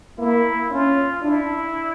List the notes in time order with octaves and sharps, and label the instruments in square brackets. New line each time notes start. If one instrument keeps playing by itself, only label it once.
[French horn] A#3 [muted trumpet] E4
[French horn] C#4 [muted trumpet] F4
[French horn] D4 [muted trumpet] E4